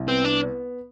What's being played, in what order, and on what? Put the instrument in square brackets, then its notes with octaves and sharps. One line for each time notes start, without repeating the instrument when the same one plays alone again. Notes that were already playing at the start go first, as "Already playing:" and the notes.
Already playing: [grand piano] C2
[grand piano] B3 [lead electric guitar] C4
[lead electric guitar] D4